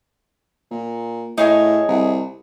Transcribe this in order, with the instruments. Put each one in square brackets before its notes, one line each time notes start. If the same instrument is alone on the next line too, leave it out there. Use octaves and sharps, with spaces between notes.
[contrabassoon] A#2
[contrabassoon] A2 [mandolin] D#4 G#4 C#5
[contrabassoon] C2